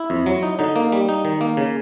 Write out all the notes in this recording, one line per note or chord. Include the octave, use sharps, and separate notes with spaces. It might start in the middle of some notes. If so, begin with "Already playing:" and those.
Already playing: E4
F2
F#3
D#4
D3 D#4
A#3
G3
D#4
D#3
A#3
C#3